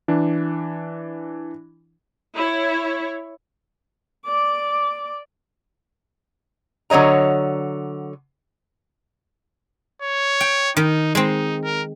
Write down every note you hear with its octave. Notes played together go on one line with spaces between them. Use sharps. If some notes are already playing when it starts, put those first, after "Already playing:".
E3 D4
E4 C#5
D5 D6
D3 F#3 C#5 D#5 A#5
C#5
G5
D#3 D#4
G#3 C4 D#4
A#4